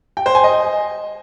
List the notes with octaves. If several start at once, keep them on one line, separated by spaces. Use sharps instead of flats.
G5
C5
G#5
D#5